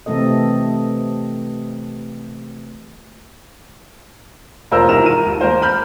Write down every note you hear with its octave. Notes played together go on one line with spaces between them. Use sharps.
C3 E3 A3 C4 A4 D#5
E1 F4 A#4 C5 E6
C2 D#3 A#4 E7 F7
A#4 D#7
D#2
A#3 A#4 C5
B5 F6 G6